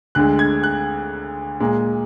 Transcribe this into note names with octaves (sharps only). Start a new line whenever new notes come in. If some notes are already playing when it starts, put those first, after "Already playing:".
D2 D3 G#3 F#6
G#6
F#6
A#2 G#3